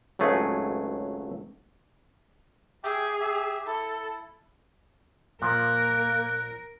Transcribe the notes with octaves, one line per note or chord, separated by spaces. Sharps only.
G#1 C#2 F#3 A3 G#4
G4 G#4 E5 G5
G4 E5
E4 A4
A#2 F3 A#3 A#4 F#6